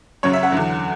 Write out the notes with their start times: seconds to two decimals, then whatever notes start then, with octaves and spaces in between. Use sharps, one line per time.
0.23 F#2 C#3 F#3 C#5
0.33 E5
0.43 F#5
0.52 E2 D3 F#3